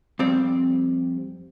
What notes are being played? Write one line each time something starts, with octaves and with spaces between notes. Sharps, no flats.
F2 G3 C4